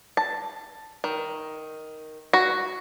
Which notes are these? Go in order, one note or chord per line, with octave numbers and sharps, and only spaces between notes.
A5
D#3
F#4